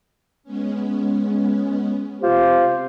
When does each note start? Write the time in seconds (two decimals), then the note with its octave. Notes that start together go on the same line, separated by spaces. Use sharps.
0.44 G#3 B3 C#4
2.21 C3 F4 G4 C5